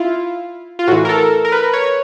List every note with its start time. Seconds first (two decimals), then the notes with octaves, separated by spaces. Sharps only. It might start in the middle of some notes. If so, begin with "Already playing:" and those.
Already playing: E4 F4
0.79 F4
0.88 A2 E3 F#4
1.05 A#4
1.09 A4
1.45 A#4
1.52 B4
1.73 C#5